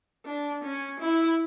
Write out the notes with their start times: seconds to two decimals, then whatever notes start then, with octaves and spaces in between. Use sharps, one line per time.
0.26 D4
0.63 C#4
1.00 E4